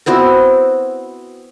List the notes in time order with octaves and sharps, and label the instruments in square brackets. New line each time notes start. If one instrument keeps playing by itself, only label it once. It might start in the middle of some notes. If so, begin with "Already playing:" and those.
[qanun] B3 C4 E4 F#4